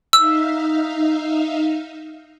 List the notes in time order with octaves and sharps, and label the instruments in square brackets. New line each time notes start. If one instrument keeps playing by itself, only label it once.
[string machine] D#4 E5 F5 [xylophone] E6